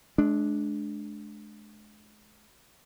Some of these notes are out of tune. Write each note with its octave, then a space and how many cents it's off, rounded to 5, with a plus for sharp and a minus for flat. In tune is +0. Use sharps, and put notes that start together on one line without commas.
G#3 +35 D4 +0